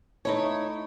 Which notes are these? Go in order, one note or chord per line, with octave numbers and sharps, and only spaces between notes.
A3 D#4 E4 C#5